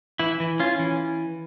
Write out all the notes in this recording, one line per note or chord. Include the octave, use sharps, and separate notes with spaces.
E3 E4
E3
C#4 F4
E3